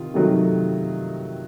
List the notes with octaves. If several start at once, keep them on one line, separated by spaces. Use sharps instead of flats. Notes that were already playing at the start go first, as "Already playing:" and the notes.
Already playing: C3 D#3 F4
C3 D#3 F#3 A3